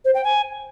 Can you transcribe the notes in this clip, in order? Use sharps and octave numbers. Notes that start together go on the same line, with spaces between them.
C5
G5
G#5